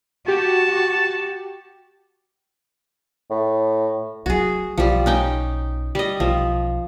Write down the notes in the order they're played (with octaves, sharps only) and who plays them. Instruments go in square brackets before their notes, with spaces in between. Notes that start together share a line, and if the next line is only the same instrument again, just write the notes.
[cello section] F#4 [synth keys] G4 [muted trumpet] A5
[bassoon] A2
[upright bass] F#3 A3 [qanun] F#4 G#4
[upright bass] B1 [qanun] F3 G3
[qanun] C#4 D#4 G5
G3 D#5
[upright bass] B1 [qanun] F3